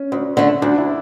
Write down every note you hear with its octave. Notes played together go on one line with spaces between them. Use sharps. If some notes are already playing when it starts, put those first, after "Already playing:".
Already playing: C#4
D2
D3 A3
D2 D4
E4